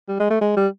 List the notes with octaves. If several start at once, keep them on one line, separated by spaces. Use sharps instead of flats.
G3
G#3
A3
G#3
G3